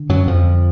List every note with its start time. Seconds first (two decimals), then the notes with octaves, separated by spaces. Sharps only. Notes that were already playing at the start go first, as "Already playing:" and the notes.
Already playing: D3
0.09 F#2 F#3
0.27 F2 F3